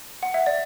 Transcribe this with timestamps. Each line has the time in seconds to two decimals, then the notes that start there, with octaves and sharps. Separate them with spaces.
0.23 F#5
0.34 E5
0.46 D5